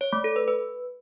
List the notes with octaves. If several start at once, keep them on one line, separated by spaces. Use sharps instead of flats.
C#5
A3
A4
B4
B4